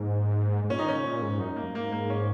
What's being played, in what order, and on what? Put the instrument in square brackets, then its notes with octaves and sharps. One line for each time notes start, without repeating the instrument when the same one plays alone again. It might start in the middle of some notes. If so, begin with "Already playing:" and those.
Already playing: [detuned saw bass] G#2 [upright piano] A#3
[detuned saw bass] G#2
[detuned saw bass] A#2 [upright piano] C#4
[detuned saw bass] D#3 [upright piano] D#4
[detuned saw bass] C#3 [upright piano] C#4
[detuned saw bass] A#2
G#2
[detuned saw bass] F#2 [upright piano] D#4
[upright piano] A#3
[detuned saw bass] F#2
[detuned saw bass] G#2 [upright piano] A#3
[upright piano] A#3
C#4